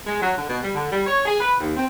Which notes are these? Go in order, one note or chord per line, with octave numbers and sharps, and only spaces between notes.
G#3
F#3
D3
B2
G3
D3
G3
C#5
G#4
B4
D#2
C4